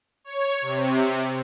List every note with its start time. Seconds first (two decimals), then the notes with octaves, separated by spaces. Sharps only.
0.24 C#5
0.61 C3